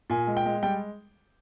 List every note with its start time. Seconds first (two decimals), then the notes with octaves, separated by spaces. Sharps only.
0.10 A#2 G#5
0.27 G#3
0.37 G5
0.46 G#3
0.63 G3 G5